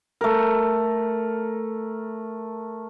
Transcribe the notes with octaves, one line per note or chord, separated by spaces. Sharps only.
A3 A#4